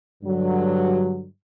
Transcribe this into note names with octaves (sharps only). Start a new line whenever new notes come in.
G2 D3 F#3